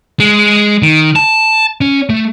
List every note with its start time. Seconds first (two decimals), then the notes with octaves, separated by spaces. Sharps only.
0.20 G#3
0.82 D#3
1.16 A5
1.81 C#4
2.10 A3